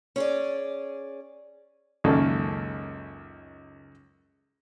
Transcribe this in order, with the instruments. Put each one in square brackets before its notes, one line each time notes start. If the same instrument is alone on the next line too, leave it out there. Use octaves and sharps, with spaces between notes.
[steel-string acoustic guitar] C#4 G#4 D5
[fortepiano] C#2 F#2 D#3 A#3 A4